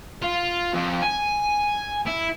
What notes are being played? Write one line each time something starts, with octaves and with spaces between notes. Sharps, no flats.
F4
F2
G#5
E4